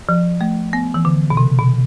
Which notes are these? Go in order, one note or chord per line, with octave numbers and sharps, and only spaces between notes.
F3
A3
B3
E3
D3
B2
C3
B2